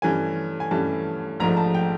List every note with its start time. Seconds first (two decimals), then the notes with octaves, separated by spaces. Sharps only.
0.02 G2 E3 A3 C#4 G#5
0.60 G#5
0.71 G2 E3 A3 C#4 A5
1.40 A#1 G#2 F3 A3 A#5
1.57 A5
1.74 G5